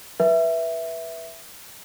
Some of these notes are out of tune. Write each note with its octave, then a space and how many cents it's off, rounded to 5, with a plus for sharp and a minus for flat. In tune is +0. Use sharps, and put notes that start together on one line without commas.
B4 -15 E5 +0